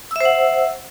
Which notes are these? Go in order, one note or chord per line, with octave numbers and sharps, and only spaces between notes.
C5 E5 F#5 E6